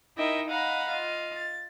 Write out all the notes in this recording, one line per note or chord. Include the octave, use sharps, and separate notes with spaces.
D#4 E4 A#4 D#5 E5 G5
D#5 F5 F#5 A#5 B5
F4 D#5 F5
A6